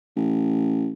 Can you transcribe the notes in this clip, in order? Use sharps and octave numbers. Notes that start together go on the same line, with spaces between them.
A1